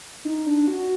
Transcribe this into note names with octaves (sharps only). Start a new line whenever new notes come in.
D#4
D4
F#4